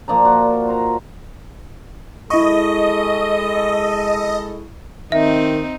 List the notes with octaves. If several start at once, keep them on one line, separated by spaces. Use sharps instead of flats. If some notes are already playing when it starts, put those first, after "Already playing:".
A#2 F3 D5 A#5
F#4
C5 A#5
G#3 E4 A4 D#5 C#6
D#3 C4 D#4 E5